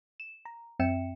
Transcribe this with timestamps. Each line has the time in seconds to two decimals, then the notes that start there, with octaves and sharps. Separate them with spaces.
0.20 E7
0.45 A#5
0.79 F#2 C4 E5 G5 C#7 E7